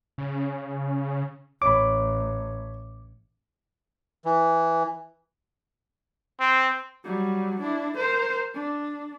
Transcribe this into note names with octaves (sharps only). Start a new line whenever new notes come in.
C#3
A1 C#5 B5 D6
E3
C4
F#3 G3
D4 E4
A#4 C5
D4